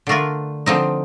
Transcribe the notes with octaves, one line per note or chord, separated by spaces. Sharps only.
D3 A3 D4 F4 A#4
D3 F3 C4 D#4